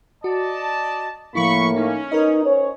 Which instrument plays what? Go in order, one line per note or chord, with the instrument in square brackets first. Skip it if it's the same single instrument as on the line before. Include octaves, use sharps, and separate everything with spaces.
[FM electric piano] F#4 [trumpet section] D5 D#5 A5
[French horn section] A2 A#3 [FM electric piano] F3 E4 [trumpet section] B5 C#6
[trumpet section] C#4 [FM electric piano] D#4
[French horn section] D#4 [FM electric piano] A#4 B4 D#5
[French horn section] C#4 C5 C#5